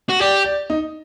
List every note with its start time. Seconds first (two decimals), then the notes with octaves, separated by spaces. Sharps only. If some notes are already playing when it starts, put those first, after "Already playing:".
0.09 F#4
0.20 G4 D5
0.45 D5
0.70 D#4